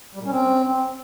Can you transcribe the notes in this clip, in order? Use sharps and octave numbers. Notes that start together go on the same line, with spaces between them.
G3
A#2
C#4
C4